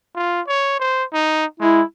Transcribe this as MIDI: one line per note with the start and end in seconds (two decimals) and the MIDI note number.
0.15 0.41 65
0.48 0.78 73
0.79 1.04 72
1.13 1.46 63
1.60 1.82 56
1.60 1.82 64